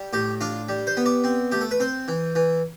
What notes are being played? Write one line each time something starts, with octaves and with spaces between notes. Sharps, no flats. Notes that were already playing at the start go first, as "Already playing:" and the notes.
Already playing: G3
A2 G4
D4 F4
G3
C5
B3
D5
C4
A3 G4
A4
B4
C4 C5
E3
E3